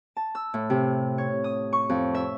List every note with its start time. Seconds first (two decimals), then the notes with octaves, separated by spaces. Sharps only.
0.17 A5
0.35 E6
0.54 A2
0.70 C3
1.18 C#5
1.44 D#6
1.73 C#6
1.89 F2
2.15 E5